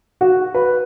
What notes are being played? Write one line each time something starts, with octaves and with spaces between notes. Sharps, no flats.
F#4
B4